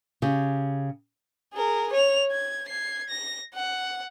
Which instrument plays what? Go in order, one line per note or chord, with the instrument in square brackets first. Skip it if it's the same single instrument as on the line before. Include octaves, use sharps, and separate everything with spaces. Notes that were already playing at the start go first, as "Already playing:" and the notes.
[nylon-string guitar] C#3 G4
[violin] G#4 A#4
C#5 F7
G#6
G#6 C7
A#6
F#5